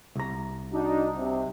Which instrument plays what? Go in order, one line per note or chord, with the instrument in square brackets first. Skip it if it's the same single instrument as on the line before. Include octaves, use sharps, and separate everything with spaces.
[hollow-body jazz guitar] C2 A#5
[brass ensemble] D4 D#4 F#4
C3